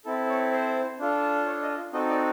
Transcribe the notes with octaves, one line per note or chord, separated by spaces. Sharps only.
C4 E4 A4
C#5
C5
D4 F4 A4
C#5
D#5
C4 D#4 F#4 A4 D#5
D5